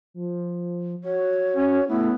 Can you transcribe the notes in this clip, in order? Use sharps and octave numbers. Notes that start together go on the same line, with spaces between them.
F3
F#4 C#5
C#4
A3 B3 E4